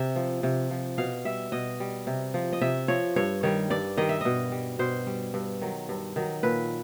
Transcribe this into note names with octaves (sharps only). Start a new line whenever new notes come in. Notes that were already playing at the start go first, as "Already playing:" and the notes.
Already playing: C3 E5
F3
C3
F3
B2 F5
G3 E5
B2 D#5
G3
C3
F3
D#5
C3 E5
F3 C#5
G2 C#5
D#3 G3 C#5
G2 D5
D#3 G3 D#5
E5
B2 D#5
G3
B2 C5
G3
G2
D#3 F#3
G2
D#3 F#3
A#2 B4